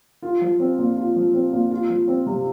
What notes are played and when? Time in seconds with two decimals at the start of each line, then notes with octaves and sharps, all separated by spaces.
0.23 F4
0.41 F3
0.60 C4
0.78 A#2
0.97 F4
1.16 F3
1.34 C4
1.52 A#2
1.71 F4
1.89 F3
2.08 C4
2.26 C3